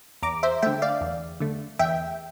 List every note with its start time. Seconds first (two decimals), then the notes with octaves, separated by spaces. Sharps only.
0.22 E2 A#5 D6
0.43 C5 E5
0.62 D3 A3 E5 G5
0.82 D5 F5
1.01 E2
1.40 D3 A3
1.79 E2 E5 G5